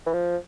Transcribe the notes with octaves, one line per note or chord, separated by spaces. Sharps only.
E3
F3